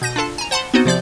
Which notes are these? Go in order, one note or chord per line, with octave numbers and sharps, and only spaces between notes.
B2 G6 A#6 D#7
D4 F4 A4 A5
G#5 A#5
C5 F#5 A5 B5 C6
B3 C4 D#4 F#4 C5
C3 F3 D5 G6